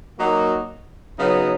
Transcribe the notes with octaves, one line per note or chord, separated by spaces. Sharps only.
F#3 A#3 D#4 F#4
C#3 F#3 B3 D#4